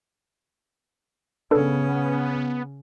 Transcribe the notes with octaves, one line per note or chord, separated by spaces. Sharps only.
C#3 B3 C#4 D4 A4 B4